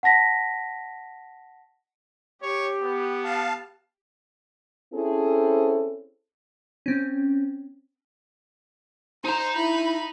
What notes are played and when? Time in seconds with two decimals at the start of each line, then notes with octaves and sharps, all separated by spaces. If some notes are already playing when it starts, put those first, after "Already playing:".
0.03 F#5 A5 A#6 B6
2.42 G4 C#5
2.82 B3
3.24 F5 A5
4.94 C4 C#4 E4 G#4 A4 C5
6.86 C4 C#4
9.25 D#4 C5 A#5
9.56 E4 B5